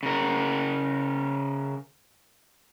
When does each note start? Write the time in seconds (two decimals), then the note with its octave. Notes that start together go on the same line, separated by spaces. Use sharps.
0.03 C#3 A#4